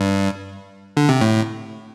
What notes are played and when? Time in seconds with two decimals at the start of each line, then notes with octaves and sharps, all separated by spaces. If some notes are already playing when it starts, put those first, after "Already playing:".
Already playing: G2
0.97 D3
1.09 C3
1.21 A2